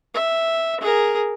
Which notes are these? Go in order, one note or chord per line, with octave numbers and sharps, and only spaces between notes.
E5
G#4 A#4